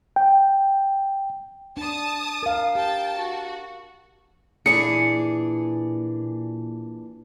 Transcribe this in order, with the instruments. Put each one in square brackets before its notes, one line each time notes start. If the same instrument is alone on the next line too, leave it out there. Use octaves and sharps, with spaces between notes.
[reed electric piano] G5
[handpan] D4 [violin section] A5 D#6
[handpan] A#4 F5
[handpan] G4 [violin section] G5 A5
[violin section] F#4
[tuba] A#2 [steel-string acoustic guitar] E3 D4 G#4 [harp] C#7